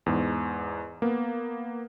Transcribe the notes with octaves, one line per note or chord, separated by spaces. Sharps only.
E2 G#2
A#3 B3